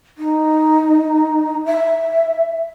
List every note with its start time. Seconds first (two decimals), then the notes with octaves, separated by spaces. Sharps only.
0.18 D#4
1.66 E5